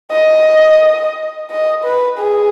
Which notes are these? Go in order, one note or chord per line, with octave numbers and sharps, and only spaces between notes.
D#5
D#5
B4
G#4